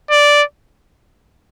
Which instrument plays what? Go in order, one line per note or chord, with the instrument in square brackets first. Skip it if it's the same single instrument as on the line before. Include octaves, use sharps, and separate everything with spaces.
[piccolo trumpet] D5